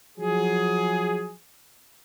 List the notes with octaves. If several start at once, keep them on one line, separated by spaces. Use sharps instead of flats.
F3 F#3 G#4